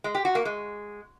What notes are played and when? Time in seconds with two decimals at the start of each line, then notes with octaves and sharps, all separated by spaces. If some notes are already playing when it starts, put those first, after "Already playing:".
0.04 G#3
0.15 G4
0.25 F#4
0.35 A#3
0.45 G#3